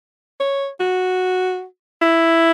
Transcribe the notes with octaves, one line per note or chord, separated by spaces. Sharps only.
C#5
F#4
E4